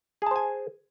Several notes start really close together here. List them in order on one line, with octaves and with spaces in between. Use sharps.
G#4 A5 C5 G#5